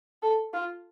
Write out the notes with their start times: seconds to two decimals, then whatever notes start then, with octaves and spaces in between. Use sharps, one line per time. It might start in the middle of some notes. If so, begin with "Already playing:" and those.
0.23 A4
0.53 F4